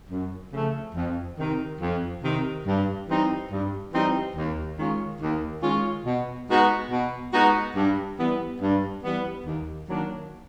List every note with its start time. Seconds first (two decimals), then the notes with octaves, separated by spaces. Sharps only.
0.10 F#2
0.53 C#3 F3 A3 C#4
0.95 F2
1.38 C3 D#3
1.80 F2
2.23 C3 D#3
2.66 G2
3.08 E3 G3 C4 D#4
3.51 G2
3.93 E3 G3 C4 D#4
4.36 D#2
4.79 D#3 G#3 C#4 F4
5.21 D#2
5.63 D#3 G#3 C#4 F4
6.06 B2
6.49 G#3 B3 D#4 F#4
6.90 B2
7.34 G#3 B3 D#4 F#4
7.76 G2
8.18 E3 G3 B3
8.61 G2
9.03 E3 G3 B3
9.46 D#2
9.89 D#3 F#3 A#3 D4